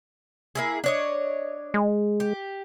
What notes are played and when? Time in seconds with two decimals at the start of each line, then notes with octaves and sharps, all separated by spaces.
0.55 A#3 E4 G#4
0.84 D4 C#5 D#5
1.74 G#3
2.20 G4